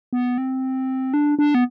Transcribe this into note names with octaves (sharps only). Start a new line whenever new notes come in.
B3
C4
D4
D4
B3